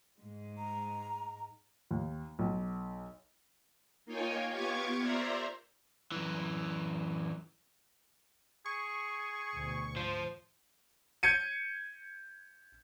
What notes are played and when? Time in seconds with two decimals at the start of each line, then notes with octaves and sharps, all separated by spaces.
0.19 G#2 G#3
0.58 A#5
1.91 D#2
2.39 B1
4.06 A#3 D#4 F4 C#5 G5 G#5
4.51 B3 F4 G4 C#6 D6 G#6
5.00 A#4 C5 D5 E5 A#5 C6
6.12 F#2 E3
8.66 G#4 C#6
9.55 D2 B2
9.96 G#2 F3 C5
11.23 G6 G#6 C#7 D#7